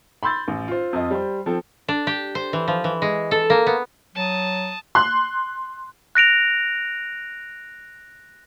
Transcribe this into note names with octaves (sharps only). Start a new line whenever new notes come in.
B5 C6 E6 G6 A6
A1
F4 C5
F2 F4 D#5
G3 C5
F3 C4 A4
D4
G4
C5
E3
F3
E3
G#3
A4
A#3
B3
F#3 A5 D#6
C6 F#6
F#6 A#6 D7 F7